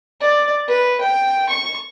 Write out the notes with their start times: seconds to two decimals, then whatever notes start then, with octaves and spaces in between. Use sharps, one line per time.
0.21 D5
0.68 B4
1.01 G5
1.49 C#6